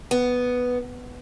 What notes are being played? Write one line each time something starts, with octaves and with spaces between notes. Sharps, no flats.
B3